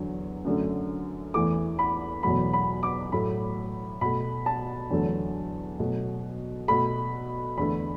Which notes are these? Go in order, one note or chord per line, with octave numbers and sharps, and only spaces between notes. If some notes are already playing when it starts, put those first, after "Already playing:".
Already playing: E2 D3 F#3
F#2 D3 F#3 A3
E2 E3 A3 D6
B5
E2 B2 F#3 A3 B5
B5
D6
A2 F#3 A3 B5
B2 A3 B5
A5
E2 D3 F#3 A3
B2 F#3 A3
B2 A3 B5
E2 D3 A3 B5